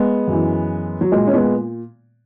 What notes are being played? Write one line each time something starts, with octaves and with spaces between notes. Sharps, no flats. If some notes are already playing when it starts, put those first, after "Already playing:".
Already playing: G#3 B3
F#2 E3
F#3
A#2 G#3
C#4
G#3 B3